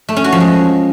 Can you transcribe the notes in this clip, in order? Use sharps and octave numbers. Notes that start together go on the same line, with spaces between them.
A3
C#4
F#4
F3
G#3